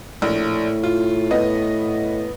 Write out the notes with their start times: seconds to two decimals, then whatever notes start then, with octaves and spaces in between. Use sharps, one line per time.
0.22 A#1 A2
0.83 F4
1.31 B3 D#5